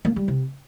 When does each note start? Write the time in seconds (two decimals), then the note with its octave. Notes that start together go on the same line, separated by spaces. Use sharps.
0.05 A#3
0.16 G3
0.28 C3